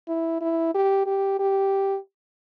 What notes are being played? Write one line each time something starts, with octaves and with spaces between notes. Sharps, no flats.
E4
E4
G4
G4
G4